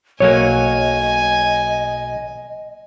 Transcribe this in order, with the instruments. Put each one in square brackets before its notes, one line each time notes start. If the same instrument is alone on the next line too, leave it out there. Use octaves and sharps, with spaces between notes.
[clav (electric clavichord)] B1 F#3 A#3 [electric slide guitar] C#5 [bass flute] D#5 [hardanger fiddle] G#5